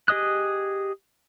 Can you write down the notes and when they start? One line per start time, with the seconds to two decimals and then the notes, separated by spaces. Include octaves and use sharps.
0.08 G4 G#4 D#5 D#6 F#6